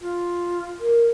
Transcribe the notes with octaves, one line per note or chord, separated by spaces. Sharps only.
F4
A#4